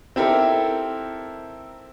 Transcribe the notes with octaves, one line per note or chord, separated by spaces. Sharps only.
C4 D#4 E4 G4 A4 A#4